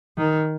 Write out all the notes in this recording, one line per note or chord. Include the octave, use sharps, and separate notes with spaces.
D#3